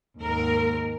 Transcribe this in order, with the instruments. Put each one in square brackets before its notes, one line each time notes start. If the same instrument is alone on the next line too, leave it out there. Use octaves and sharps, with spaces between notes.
[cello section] D#2 G#2 A#4